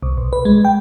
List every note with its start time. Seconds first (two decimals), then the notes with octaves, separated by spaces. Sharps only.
0.03 C2
0.17 B1
0.33 B4
0.45 G#3
0.65 G5